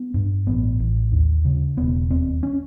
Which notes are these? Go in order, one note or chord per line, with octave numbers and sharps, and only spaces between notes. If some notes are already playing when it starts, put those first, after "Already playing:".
Already playing: B3
G2
A1 B3
A1
D#2
C#3
E1 B3
D#2 C4
C#4